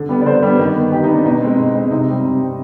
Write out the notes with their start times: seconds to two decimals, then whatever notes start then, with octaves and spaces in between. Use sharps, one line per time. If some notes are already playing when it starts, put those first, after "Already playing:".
Already playing: D3
0.09 G3 B3
0.21 D5
0.26 D3 C5
0.42 G3 B3
0.59 D#3
0.75 B3
0.92 D#3 G4
1.04 D#4
1.09 B3
1.14 D4
1.25 B2 D#4
1.42 G#3 C4
1.58 B2
1.75 G#3 C4
1.91 C3 D#4
2.08 G3 C4
2.24 C3
2.41 G3 C4